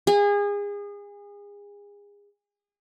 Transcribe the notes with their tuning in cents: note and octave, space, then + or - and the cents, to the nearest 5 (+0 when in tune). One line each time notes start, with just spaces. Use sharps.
G#4 -30